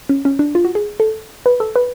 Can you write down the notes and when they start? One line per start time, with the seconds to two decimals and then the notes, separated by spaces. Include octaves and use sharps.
0.09 C#4
0.25 C#4
0.39 D4
0.55 F4
0.65 F#4
0.75 G#4
1.00 A4
1.46 B4
1.60 A4
1.76 B4